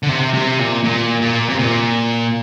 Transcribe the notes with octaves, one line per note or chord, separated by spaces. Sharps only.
D3
C3
C3
A#2
A#2
A#2
C3
A#2